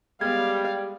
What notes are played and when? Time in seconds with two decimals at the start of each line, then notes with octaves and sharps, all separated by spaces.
0.21 G3 G#3 B3 F5 G#6